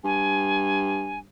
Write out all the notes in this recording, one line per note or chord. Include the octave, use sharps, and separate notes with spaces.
G2 G#5